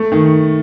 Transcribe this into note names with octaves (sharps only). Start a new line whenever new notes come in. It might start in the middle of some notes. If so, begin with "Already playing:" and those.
Already playing: A3
D#3